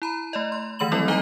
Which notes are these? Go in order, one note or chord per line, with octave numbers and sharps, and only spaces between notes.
E4 A#5 B5
A3 D5 D#5
C6
D#3 E3 A3 B5 F#7
F#3 G3 C4 E4 A4 D#5
E3 D#4 D#5 G#5 A#5 G7